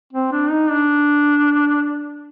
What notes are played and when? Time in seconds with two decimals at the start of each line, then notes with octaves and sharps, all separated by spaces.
0.13 C4
0.32 D4
0.51 D#4
0.70 D4